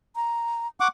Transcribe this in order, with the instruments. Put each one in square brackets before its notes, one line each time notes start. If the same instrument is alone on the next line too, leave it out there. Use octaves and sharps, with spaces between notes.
[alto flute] A#5
[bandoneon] F#5 D6 [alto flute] C#6